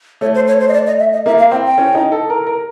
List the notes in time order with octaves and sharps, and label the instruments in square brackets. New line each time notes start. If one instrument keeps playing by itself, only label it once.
[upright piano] A3 [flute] C#5
[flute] C5
C#5
C5
D#5
D5
D#5
E5
D#5
[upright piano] A#3 [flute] E5
[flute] F5
[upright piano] C4 [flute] G5
[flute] G5
[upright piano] C#4
D#4
A4
A#4
A#4